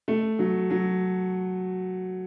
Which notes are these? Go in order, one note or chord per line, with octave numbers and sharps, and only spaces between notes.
A3
F#3
F#3